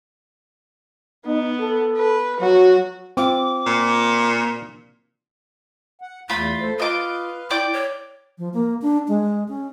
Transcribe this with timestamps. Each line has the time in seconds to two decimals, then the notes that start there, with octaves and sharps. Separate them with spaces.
1.26 B3 D#4
1.60 A4
1.97 B4
2.40 F#3 F#4
3.17 C4 F4 D6
3.66 A#2
6.01 F#5
6.30 E2 A3 F4 B5
6.61 A4 C5
6.80 F4 B4 D#5 F5 D6
7.51 E4 D5 G5 D6
7.73 C#5
8.38 F3
8.54 A#3
8.82 D4
9.08 G#3
9.48 C#4